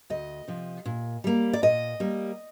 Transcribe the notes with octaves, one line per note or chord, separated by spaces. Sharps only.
D2 D#5
C3 F3
A#2
G3 A#3
D5
A#2 D#5
G3 A#3